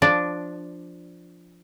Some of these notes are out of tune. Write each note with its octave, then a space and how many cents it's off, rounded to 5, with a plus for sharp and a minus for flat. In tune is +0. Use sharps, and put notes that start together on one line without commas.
F3 +0 D4 +0 D5 +0